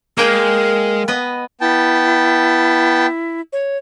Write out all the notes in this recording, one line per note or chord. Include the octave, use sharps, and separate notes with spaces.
G#3 A#3 A#4 G5 G#5
B3 B4 D#5
B3 E4 G5 A5
C#5